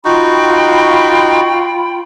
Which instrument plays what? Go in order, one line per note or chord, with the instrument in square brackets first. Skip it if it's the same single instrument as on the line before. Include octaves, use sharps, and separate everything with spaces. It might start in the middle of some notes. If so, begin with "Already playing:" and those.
[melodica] D#4 F#4 [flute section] F4 G5 B5